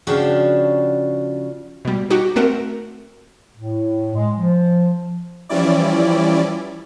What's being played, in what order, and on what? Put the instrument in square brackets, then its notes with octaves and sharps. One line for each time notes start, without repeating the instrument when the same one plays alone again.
[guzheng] C#3 F3 D4 F#4 G4
[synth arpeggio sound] B2 G3
D#4 F#4 G4
A3 C4 F#4 A#4
[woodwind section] A2
G#3
F3
[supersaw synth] E3 F3 G3 C#4 E4 D5